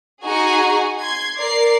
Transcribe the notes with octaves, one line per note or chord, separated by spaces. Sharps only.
D#4 F#4 G#4 G#5
C6 G#6
A#4 D5 C7